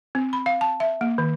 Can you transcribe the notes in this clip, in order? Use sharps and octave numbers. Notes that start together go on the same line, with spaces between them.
C4
B5
F5
A5
E5
A#3
D#3